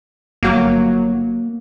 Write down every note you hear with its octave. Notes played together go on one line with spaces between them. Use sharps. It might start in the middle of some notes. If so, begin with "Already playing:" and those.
G1 F#3 A#3